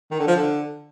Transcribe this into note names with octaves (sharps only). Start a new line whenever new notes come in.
D#3
D3
F3
D3